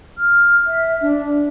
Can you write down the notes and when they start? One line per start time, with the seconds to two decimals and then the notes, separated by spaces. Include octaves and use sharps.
0.18 F6
0.67 E5
1.01 D4